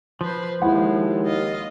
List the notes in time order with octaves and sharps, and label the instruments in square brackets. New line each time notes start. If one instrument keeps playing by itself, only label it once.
[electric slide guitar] F3 [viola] B4 C5
[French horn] D#2 [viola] G#3 [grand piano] E4 F#5
[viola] F4 D#5